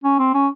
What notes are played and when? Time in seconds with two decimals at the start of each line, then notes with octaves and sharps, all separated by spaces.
0.04 C#4
0.19 C4
0.34 C#4